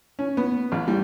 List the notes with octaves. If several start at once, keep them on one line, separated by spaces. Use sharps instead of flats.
C#4
B3
A1
G3